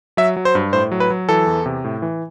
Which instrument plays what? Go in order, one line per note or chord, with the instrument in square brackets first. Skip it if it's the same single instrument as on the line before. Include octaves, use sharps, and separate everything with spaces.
[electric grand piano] F#3 E5
F#3
C5
G2
A2 C5
F#3
B4
F#3
E3 A4
E2
C3
A2
E3